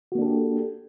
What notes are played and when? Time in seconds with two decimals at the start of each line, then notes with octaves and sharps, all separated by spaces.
0.12 F#4
0.15 A#3
0.18 D4
0.22 A4
0.25 G4